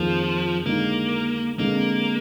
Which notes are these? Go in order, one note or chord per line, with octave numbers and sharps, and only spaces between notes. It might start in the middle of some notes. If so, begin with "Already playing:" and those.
Already playing: F2 D#3 F3 A#3 F4 G#4
D3 G#3 A#3 D#4
D3 G#3 A#3 C4